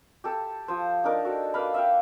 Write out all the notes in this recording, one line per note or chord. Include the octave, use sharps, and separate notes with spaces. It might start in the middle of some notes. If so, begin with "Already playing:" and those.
G4 A4 A5
F3 C5
D4 D#4 A#4 D5
F#4 A4
A#3 B4 F5 B5
E5 F5 G5